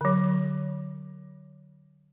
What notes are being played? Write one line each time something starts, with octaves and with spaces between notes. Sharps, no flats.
D3 F#3